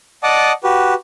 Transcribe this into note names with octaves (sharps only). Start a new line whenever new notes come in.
D5 D#5 F#5 A5 D6 D#6
F#4 G4 B4